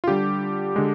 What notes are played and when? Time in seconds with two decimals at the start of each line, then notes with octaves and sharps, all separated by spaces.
0.04 F4
0.08 D3 G3 G4
0.76 D3 G#3